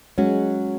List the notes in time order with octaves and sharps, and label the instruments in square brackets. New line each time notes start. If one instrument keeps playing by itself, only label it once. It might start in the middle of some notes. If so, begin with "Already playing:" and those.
[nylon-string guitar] F#3 C#4 F#4 [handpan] G#3